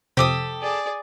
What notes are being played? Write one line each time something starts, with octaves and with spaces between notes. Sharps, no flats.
F2 C3 G4 A4 C5 D6 D#6
G#4 D5